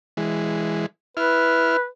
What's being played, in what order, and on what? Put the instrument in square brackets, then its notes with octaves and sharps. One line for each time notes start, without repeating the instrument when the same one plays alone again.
[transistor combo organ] E3 G#3
[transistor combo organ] E4 F6 [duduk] B4